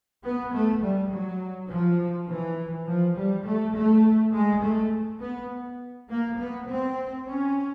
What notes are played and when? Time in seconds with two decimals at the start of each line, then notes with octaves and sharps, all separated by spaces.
0.23 B3
0.52 A3
0.82 G3
1.12 F#3
1.69 F3
2.28 E3
2.86 F3
3.16 G3
3.45 A3
3.74 A3
4.33 G#3
4.62 A3
5.20 B3
6.08 A#3
6.37 B3
6.67 C4
7.26 C#4